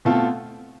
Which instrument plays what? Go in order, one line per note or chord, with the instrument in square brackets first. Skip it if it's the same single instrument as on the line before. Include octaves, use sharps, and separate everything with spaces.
[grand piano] B2 A3 C4 F4 A4